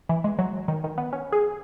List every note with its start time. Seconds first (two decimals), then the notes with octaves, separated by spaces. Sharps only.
0.09 E3
0.24 G#3
0.39 F#3
0.68 D#3
0.84 D#3
0.98 B3
1.13 C#4
1.32 G#4